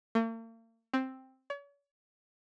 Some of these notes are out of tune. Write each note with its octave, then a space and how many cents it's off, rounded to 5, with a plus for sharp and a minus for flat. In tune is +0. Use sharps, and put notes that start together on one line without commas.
A#3 -45
C4 +5
C#5 +40